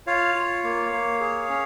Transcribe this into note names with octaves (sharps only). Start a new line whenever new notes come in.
F4 C#5 F5
F4
A#3
A#3
G#4
C#4